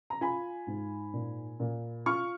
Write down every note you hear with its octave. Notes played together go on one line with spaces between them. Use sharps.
A#5
F4 G#5 B5
G#2
A#2
A#2
F4 C#6 F6